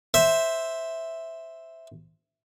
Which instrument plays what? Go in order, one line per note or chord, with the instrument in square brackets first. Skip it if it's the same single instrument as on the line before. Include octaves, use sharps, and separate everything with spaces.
[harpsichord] C5 E5